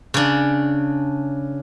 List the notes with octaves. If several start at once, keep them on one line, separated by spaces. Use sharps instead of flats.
C#3 D4